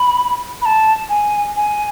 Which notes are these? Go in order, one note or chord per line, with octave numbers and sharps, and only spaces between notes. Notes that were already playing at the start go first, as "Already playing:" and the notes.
Already playing: B5
B5
A5
G#5
G#5